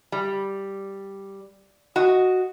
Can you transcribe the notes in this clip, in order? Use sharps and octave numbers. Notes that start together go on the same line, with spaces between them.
G3
F#4 D#5